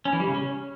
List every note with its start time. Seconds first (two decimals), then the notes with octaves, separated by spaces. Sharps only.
0.05 C#4
0.13 E3
0.20 G3
0.27 C#3
0.34 C#4